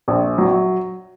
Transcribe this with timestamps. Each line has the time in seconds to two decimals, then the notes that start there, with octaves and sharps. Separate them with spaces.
0.08 A#1
0.38 F#3